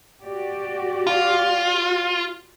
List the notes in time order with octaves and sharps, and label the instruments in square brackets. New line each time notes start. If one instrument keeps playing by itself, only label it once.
[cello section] F#4 G4 D5
[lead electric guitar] F4